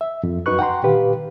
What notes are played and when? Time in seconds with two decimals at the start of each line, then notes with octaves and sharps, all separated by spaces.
0.01 E5
0.23 F2
0.46 F#2 D#4 F#4 B4 C#6 F#6
0.59 F#5 G5 A#5 C6
0.83 A#2 D3 D#3 G4 B4 F5